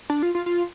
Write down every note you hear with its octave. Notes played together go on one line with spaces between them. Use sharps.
D4
F4
F4
F4